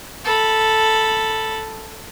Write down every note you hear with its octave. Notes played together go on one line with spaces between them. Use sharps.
A4 B5